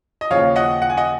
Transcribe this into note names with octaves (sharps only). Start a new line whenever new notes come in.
D#5
D#2 C#3 F3 C#5 F5
D#5 F#5
F#5
G#5
D#5 F#5